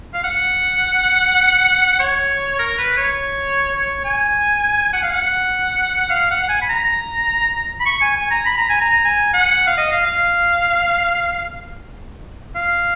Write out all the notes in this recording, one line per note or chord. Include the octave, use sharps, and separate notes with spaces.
F5
F#5
C#5
A#4
B4
C#5
C#5
G#5
F#5
F5
F#5
F5
F#5
F#5
G#5
B5
A#5
B5
C#6
G#5
G#5
A#5
B5
A#5
G#5
A#5
G#5
F#5
F5
D#5
F5
F5
F5